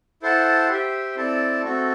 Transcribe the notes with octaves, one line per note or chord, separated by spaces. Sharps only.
E4 A4 C5 F#5 A5
G4 C5 E5 G5
C4 E4 A4 D5 A5
A3 C4 F#4 A4